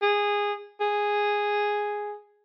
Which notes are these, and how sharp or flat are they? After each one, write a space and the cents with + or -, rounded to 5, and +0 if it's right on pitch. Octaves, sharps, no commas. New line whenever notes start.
G#4 -15
G#4 -5